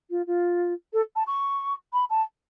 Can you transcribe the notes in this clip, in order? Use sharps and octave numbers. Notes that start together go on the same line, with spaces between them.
F4
F4
A4
A5
C#6
B5
A5